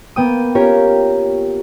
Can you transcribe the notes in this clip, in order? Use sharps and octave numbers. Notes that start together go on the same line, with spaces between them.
A#3 B3 G5 D#6
C#4 F4 G4 A#4 C#5